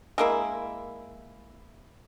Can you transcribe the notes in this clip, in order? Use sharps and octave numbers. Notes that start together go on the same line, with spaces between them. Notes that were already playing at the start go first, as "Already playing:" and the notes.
G#3 A#3 E4